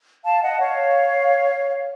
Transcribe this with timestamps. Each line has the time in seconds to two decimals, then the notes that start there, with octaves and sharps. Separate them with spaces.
0.24 F5 A5
0.42 D#5 F#5
0.60 C#5 F5